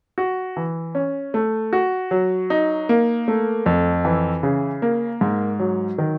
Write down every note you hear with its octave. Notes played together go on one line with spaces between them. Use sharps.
F#4
E3
C#4
A3
F#4
F#3
D#4
A#3
A3
F2
E3
C#3
A#3
G#2
F#3
D#3